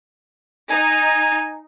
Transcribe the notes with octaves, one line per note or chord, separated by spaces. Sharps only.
D#4 G#5